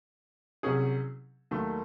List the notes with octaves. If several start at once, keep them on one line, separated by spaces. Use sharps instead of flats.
C2 C3 F#3 C#4 G#4
D#2 D#3 F#3 A3